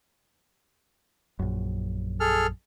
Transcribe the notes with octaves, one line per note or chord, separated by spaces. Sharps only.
A#1 F#2
G#4 A4 F6